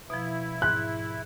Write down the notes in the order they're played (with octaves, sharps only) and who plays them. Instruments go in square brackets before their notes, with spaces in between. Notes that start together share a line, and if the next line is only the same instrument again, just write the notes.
[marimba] B2 F3 [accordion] E4
[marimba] G#2 [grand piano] F#6